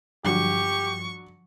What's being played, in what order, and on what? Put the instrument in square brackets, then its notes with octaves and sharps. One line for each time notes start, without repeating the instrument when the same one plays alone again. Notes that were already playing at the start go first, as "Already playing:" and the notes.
[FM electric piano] G2 F3 [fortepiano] D3 F#3 [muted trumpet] G4 [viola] C#6